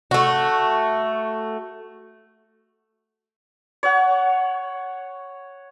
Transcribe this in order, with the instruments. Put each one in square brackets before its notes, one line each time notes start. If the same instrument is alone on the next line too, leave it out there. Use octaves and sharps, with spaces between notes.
[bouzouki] A3 F#4
[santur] C#5 F#5